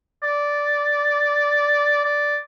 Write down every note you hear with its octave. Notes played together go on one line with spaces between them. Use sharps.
D5
D5